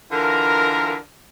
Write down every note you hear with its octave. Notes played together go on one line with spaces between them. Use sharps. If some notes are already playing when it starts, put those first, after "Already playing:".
D3 E3 F4 A#4